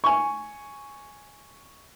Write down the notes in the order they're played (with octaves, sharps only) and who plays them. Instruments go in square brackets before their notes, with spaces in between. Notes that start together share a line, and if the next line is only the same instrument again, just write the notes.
[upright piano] G#5 C#6